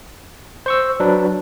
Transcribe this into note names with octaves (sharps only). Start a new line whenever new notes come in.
C5 C#6 E6
F#3 D4 B4